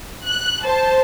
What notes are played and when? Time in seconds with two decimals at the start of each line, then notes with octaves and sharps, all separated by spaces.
0.25 F#6
0.64 C5 A5